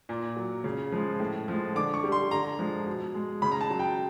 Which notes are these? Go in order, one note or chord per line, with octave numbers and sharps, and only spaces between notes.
A#2
F#3
C#3
F3 G#3
A2
F3 G#3
D3 D6
C#6
G3
C6
D3 A#5
F3 G#3
B2
G#3
C#3 B5
A#5
A5
F#3
G5